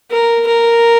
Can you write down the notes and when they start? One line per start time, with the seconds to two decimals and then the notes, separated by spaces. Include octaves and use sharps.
0.11 A#4
0.47 A#4